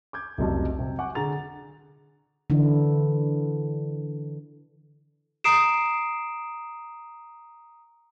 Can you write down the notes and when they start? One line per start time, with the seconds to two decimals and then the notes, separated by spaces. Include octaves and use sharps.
0.13 D6 G6 G#6
0.38 F1 C2 C#3 F#3 D#5 A5
0.79 C3 F#3
0.99 F#5 G#5 C#6 D6
1.15 D3 G#4 F#5 A#5 A6 F7
2.50 D3 E3 D4 E4
5.44 A#5 D#6 C7 D7 E7